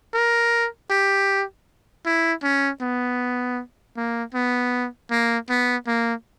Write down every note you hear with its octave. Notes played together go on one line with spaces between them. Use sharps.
A#4
G4
E4
C#4
B3
A#3
B3
A#3
B3
A#3